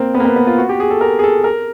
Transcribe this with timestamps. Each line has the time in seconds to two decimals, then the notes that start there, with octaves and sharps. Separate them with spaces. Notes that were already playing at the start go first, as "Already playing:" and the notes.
Already playing: A#3 C4
0.14 B3
0.20 A#3
0.25 B3
0.36 B3
0.47 F4
0.58 F#4
0.69 G4
0.80 G#4
0.90 A4
1.01 A#4
1.19 G#4
1.23 A4
1.44 A#4